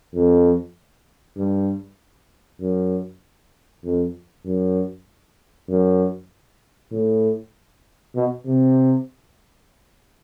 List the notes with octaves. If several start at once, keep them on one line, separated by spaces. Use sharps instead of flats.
F2
G2
F#2
F2
F#2
F#2
A2
B2
C3